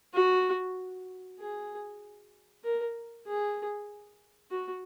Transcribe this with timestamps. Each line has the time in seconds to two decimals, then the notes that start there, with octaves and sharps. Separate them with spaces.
0.14 F#4
1.39 G#4
2.64 A#4
3.27 G#4
4.51 F#4